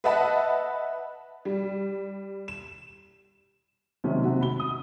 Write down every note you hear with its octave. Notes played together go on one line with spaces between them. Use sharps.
B4 D#5 E5 F#5 A5 B5
G3
E7
C3 D#3 F#3 G#3 A3 C#4
C3 F#4
B5 G7
D#6